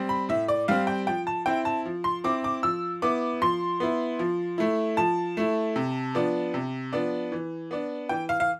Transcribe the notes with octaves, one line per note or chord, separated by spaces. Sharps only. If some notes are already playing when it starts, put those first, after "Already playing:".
Already playing: G3 C4
B5
A2 E5
D5
G3 C4 F5
G5
F3 G5
A5
C4 E4 G5
A5
F3
C6
C4 E4 D6
D6
F3 E6
B3 E4 D6
F3 C6
B3 E4
F3
A3 E4
F3 A5
A3 E4
C3
F3 B3 D4
C3
F3 B3 D4
E3
B3 D4
E3 G5
F5
F5